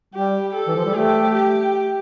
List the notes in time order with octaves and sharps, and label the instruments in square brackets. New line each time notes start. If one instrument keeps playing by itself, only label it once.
[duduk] G3 [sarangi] G4
[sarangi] A4
[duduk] E3
F3
G3
[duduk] A3 [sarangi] G4
[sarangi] G4